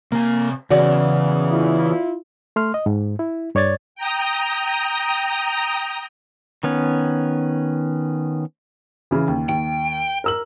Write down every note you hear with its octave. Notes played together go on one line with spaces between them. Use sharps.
C3 A#3 G#5
C#3 E3 B3 F#4 D5 F#5
E4 F4
A3 C6 F6
D#5
G#2
E4
G2 C#5 D5 G#6 A6
G5 A#5 D#6
D#3 B3 C#4
C#3 E3
D#2
D#2 G5
A#4 E6 F#7